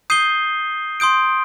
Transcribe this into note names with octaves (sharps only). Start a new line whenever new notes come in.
D#6 G6 C7 D#7 G7
C6 D#6 G6 D7